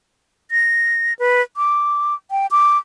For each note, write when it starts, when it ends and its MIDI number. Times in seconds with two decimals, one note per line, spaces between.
0.51 1.13 94
1.19 1.42 71
1.57 2.14 86
2.31 2.47 79
2.51 2.78 86